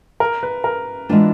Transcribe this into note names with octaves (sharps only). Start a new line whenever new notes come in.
A#4
B4
A#4
E3 G#3 B3 D4 F4